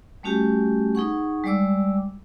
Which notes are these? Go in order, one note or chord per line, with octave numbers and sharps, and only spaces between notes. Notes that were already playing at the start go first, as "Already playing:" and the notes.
G3 A3 C#4 F#4 G4 G#5
D#4 G#4 F#5 C#6
G3 G#3 D5 D6 E6